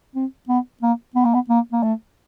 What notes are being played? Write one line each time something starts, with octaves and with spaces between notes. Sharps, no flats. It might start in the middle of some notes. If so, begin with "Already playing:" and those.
C4
B3
A#3
B3
A#3
B3
A#3
A#3
A3